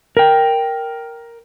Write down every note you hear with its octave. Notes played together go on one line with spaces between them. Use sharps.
A#4 G5